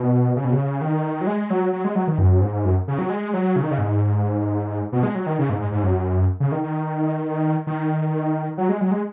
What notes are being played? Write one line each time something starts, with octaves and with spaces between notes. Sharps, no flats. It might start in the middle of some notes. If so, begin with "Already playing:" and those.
Already playing: B2
C#3
B2
C#3
D#3
F#3
G#3
F#3
F#3
G#3
F#3
D#3
F#2
G#2
F#2
C#3
F#3
G#3
F#3
C#3
D#3
C#3
G#2
B2
G#3
F#3
D#3
C#3
G#2
G#2
G#2
F#2
C#3
D#3
D#3
D#3
F#3
G#3
F#3
G#3